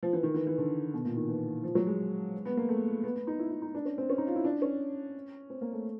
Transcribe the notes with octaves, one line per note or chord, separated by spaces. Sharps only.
F3
E3
D#3
E3
E3
D3
B2
A#2
D#3
E3
F3
F#3
G#3
B3
A#3
A3
B3
B3
D#4
E4
E4
D#4
D4
C#4
C4
C#4
D#4
F4
E4
D4
C#4
C4
A#3
A3